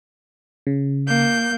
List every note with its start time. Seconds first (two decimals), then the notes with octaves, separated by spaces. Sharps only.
0.67 C#3
1.07 A#3 G6